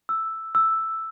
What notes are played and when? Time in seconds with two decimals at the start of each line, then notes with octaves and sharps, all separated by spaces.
0.09 E6
0.55 E6